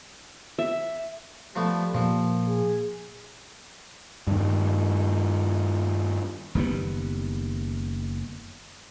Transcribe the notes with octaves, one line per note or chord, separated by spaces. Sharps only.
E5
F3 G3 A3 B3
A#2 F3 A#3
G#4
G2 D#3
F#1 D#3 G3 B3